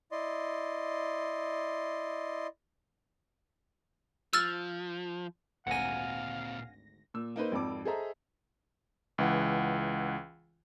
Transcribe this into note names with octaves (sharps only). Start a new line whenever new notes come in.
E4 D5 D#5 C6
F3 E6 F6 A6
G#1 D2 A#2 C4 F5 F#5 G#5 A#6
A#2 E6
A#3 D#4 B4 C5
G#1 F2 D6
G#4 A4 C5 D#5 E5 A#5
C#2 E3 F#5